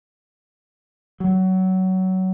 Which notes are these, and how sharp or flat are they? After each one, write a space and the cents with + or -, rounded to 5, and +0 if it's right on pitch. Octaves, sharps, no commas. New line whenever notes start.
F#3 +20